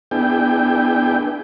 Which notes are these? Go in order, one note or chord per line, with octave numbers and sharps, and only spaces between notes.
B3 D4 E4 G#4 G5